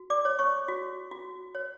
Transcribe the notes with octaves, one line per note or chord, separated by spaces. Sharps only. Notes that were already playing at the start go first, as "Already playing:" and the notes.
Already playing: F#4
D5 D6
C#5
C#5 C#6
F#4
F#4
C#5